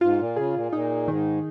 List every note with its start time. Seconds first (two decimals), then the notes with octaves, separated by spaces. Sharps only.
0.01 G#2 F4
0.19 A#2
0.36 C#3 G#4
0.54 A#2
0.72 A#2 D#4
1.08 G#2 D#3